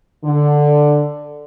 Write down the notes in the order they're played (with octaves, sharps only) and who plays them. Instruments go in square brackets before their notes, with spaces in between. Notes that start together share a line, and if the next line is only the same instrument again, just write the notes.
[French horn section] D3